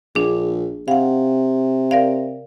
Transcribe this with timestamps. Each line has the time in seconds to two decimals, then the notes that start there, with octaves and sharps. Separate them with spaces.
0.15 A#1 D4 G#4
0.88 C3 F5 F#5
1.91 A#4 D5 F5